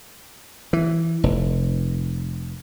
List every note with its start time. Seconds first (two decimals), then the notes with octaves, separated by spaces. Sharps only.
0.73 E3
1.24 F1